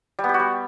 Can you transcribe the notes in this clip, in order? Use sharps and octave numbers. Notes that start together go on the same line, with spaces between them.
G3
B3
G4
F#4
G3